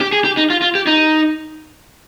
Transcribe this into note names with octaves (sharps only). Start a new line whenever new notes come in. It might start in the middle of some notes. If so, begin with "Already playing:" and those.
G4
G#4
G4
D#4
F4
F4
G4
D#4